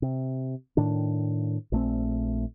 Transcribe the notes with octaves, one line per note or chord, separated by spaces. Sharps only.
C3
A2 D#3 D4
A#1 A3 C4